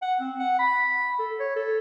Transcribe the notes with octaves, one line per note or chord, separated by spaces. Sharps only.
F#5
C4
F#5
B5
A4
C#5
A4